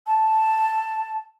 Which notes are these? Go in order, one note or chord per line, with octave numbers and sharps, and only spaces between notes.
A5